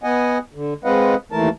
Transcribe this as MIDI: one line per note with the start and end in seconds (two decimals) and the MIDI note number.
0.03 0.38 59
0.03 0.38 75
0.03 0.38 78
0.03 0.38 80
0.54 0.74 50
0.84 1.15 56
0.84 1.15 60
0.84 1.15 71
0.84 1.15 75
0.84 1.15 77
0.84 1.15 78
1.32 1.49 39
1.32 1.49 52
1.32 1.49 57
1.32 1.49 70
1.32 1.49 81